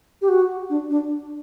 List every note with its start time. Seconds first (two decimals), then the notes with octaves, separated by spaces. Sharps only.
0.21 G4
0.28 F#4
0.69 D4
0.89 D4